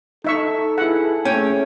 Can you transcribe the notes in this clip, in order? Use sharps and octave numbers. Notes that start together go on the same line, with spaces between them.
D#4 A4 E5 C#6
E4 G#4 F#5
A3 C#4 G5